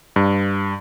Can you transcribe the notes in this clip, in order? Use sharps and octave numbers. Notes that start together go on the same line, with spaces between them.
G2